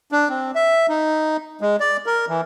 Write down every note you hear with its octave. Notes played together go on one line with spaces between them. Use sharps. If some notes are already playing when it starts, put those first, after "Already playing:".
D4
C4
E5
D#4
G#3
D5
A#4
E3